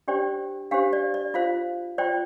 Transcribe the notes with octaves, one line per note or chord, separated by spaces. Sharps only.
D4 G4 C5 D5 G5
D4 G4 C5 F5
D5
D5
F4 C5 F5
F4 C5 D5 G5